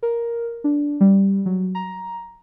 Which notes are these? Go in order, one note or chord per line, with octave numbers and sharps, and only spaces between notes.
A#4
D4
G3
F#3
A#5